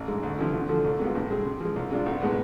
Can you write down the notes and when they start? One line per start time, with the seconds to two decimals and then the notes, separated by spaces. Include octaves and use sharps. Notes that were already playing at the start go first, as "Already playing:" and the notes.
Already playing: A1
0.08 G#2 G#3
0.23 D2
0.39 C3 F3 A3 E4
0.53 D2
0.69 D3 F3 A3
0.84 C2
1.00 C3 G#3 B3 F4
1.15 A2
1.30 G#3 C4 G#4
1.45 C3
1.60 F3 G#3
1.76 C2
1.91 C3 G#3 D4 F4
2.06 B1
2.22 A2 G#3 B3